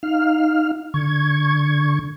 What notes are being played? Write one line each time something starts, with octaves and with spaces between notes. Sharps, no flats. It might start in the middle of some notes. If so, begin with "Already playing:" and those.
D#4 F5 F6
D3 C#6 G#6